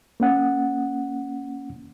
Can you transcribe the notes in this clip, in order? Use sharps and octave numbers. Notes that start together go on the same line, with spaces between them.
A#3 C#4 F#5